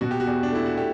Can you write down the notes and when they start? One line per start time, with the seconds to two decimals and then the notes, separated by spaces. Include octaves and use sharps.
0.01 B2 F#4
0.11 G4
0.20 F#4
0.27 E2
0.43 D4
0.52 A3 E4
0.66 F#4
0.77 A3 G4